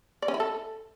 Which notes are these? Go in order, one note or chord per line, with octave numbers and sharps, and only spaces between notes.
D5
C#4
E4
A4